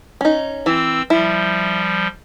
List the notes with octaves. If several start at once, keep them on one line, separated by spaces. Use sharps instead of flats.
C#4 D#4
E3 C4 E6
F3 G3 E4